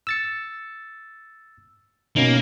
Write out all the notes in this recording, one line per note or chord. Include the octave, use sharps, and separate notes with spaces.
E6 A6 C#7
B2 A#3 C#4 D#4